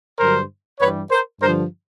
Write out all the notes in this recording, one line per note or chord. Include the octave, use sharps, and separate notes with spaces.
G2 D3 F#3 A#4 C5
G2 E3 G3 B4 C#5
A#4 C5
G2 D3 F3 A#4 C5